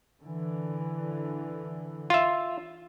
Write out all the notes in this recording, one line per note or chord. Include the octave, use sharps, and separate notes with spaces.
D3 E3
F4 E5